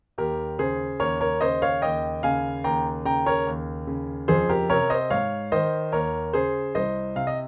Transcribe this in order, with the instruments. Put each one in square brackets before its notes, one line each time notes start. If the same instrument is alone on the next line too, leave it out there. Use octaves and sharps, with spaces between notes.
[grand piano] D#2 G4 A#4
C#3 G#4 C5
D#2 A#4 C#5
A#4 C#5
C#3 C5 D#5
C#5 F5
D#2 D#5 G5
C#3 F5 G#5
D#2 G5 A#5
C#3 G5 A#5
A#4 C#5
D#2
C#3
F2 G#4 C5
G4 A#4
C3 A#4 C#5
C5 D#5
G#2 C#5 F5
D#3 C5 D#5
D#2 A#4 C#5
C#3 G#4 C5
C2 C5 D#5
C3 F5
D#5